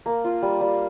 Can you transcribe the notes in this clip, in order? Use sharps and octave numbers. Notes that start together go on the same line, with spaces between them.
A#3
F4
G3
G3